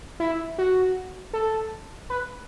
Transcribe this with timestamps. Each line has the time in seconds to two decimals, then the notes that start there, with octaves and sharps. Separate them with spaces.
0.20 E4
0.58 F#4
1.33 A4
2.10 B4